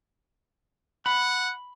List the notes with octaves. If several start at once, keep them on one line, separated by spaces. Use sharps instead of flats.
F#5 B5